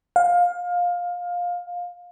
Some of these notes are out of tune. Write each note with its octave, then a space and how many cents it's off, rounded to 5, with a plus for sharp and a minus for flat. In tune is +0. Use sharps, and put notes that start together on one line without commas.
F5 +20